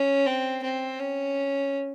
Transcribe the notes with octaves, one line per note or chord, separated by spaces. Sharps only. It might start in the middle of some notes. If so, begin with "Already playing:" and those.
Already playing: C#4
C4
C4
C#4